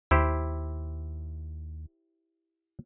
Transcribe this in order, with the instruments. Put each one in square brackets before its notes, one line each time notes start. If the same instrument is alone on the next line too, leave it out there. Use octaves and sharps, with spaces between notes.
[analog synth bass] D#2 [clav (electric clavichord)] E4 G4 C5